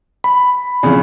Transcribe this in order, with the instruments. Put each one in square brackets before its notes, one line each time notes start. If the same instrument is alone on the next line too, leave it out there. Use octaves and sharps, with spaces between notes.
[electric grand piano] B5
[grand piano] E2 C#3 [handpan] F3 C4 D5